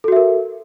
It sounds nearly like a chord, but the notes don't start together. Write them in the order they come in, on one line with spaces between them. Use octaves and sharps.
A4 F#4 E5 A#4